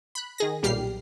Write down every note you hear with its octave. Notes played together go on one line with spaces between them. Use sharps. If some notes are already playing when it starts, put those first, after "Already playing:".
B5 F#6
D#3 G#4 A#6
B1 A#2 G3 G4 F6 C7